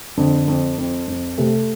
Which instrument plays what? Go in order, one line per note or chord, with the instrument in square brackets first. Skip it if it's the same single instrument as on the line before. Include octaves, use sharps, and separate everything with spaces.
[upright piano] F2 [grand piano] D3
[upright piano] F2
F2
F2
[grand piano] C3 [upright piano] A3